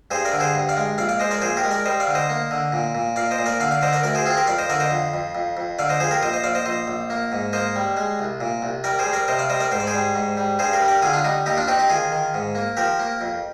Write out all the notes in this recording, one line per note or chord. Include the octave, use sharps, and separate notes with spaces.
G2 G#4 C5
A#4 D5
D3
G#4 C5
G2
D5 F5
G#3
A#1 D5 F5
D5 F5
G#3 C5 D#5
A#4 D5
A#1 G#4 C5
G4 A#4
G#3
A#4 D5
G3 C5 D#5
D5 F5
D3
C5 D#5
A#3
D3
A#2
A#2
A#2 D5 F5
C5 D#5
A#2
A#4 D5
D3 D5 F5
D5 F5
D3 C5 D#5
A#4 D5
D2 A#4 D5
G#4 C5
C4 F4 G#4
G4 A#4
F2 D5 F5
C5 D#5
D3 A#4 D5
C5 D#5
F2
F2
F2
F2
D3 D5 F5
C5 D#5
F2 G#4 C5
G4 A#4
A#1 C5 D#5
C5 D#5
A#1 D5 F5
C5 D#5
A#1 C5 D#5
A#1
A#3
G#2
A#3 C5 D#5
G3
G#3
C2
A#2
C2
G3 A#4 D5
G#4 C5
G3
A#4 D5
C3 C5 D#5
D5 F5
G3 C5 D#5
A#4 D5
G#2 C5
D5
G#4 C5
G3
G#2
G3
G2 G#4 C5
G4 A#4
G3
G4 A#4
D3 F4 G#4
D4 F4
G3 D#4
D#2 D#4 G4
D4 F4
C4 D#4 G4
D#4 G4
D#3 F4 G#4
D#3
G#2
A#3
F3 G4 A#4
A#3
F2